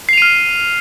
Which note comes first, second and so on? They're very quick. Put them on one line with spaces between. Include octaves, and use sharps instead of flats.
C7 F7 D#7 F6